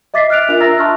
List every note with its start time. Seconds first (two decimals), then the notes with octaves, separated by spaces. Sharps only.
0.14 D#5 E5 D6 A6 B6 C7
0.30 F6 F#6 D7 F7
0.49 D4 F4 A#4 E5 F7
0.60 E5 A#5 E6 A6 A#6
0.79 A5 C6 C#6 F6